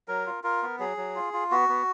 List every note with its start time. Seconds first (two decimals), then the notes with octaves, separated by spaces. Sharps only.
0.08 F#3 A#4
0.27 F4
0.44 F4 A#4
0.63 B3
0.79 F#3 G#4
0.97 F#3
1.16 F4
1.33 F4
1.51 B3 F#4
1.69 B3